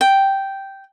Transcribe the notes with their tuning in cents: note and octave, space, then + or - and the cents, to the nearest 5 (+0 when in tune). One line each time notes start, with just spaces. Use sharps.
G5 -5